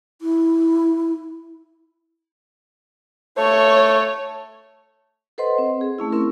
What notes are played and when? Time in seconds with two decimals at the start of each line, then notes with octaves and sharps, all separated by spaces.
0.22 E4
3.38 A3 C#5
5.38 A4 B4 C5 D#5 F#5 C6
5.58 C4
5.81 G#4
5.99 A3 C#4 E4
6.12 C4 C#4 E4 A#4